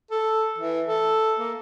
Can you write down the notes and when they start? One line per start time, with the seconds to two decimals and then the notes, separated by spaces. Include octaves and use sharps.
0.11 A4
0.58 E3
0.87 A4
1.39 A#3